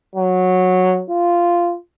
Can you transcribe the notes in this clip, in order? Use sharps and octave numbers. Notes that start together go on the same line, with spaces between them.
F#3
F4